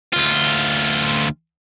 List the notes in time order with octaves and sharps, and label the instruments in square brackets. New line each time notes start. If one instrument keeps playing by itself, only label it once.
[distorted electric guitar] D2 F4